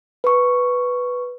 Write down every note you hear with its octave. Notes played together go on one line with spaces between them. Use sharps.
B4 C#6